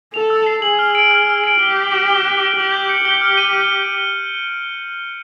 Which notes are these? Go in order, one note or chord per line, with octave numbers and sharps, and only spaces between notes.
A4 F7
E6
C7
G#4 F#7
F6
D7
F6
F6
D7
G4 G7
G6
D7
G7
F#6
D7
G4 F#7
G6
C#7
G4 G7
F6
D#7